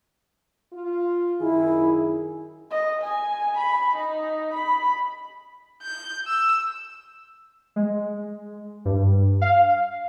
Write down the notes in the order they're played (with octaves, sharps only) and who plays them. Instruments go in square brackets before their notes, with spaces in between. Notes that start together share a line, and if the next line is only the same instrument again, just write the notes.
[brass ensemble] F4
[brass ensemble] F#2 D#3 [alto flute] E4 [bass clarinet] G#4
[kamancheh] D#5
G#5
B5
D#4
B5
[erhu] G6
E6
[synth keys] G#3
G2
F5